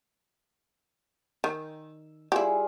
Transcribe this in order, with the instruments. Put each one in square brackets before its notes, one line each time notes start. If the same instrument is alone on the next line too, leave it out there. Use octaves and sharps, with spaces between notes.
[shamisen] D#3 [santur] E6
[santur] G3 F4 G#4 [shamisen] E4 G4